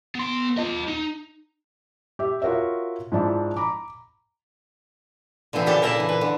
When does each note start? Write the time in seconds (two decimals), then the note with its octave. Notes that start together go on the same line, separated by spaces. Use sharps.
0.15 B3 C6
0.58 F4 D#5
0.88 D#4
2.19 G4 E5
2.42 F4 F#4 A#4 C#5 E5
3.12 G#2 F3 D4 E4
3.57 A#5 B5 D6
5.53 D3 E3 F3 C4 E4
5.66 A#2 C#3 D4 G4 A4 A5
5.82 A#3 A#4 E5 F#5 A5
5.96 A#2 E3
6.09 B4
6.21 D3